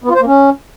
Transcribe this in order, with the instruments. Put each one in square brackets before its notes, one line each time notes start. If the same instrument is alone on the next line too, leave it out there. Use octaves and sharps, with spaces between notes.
[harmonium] B3
F4
C5
A#3
C#4